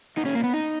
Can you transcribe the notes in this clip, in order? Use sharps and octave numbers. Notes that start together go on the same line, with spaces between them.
A#2 D#4
C#4
A#3
B3
D#4